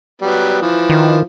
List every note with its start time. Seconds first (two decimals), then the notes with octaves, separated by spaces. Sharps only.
0.22 F#3 G3 B3
0.62 E3 F3
0.90 D#3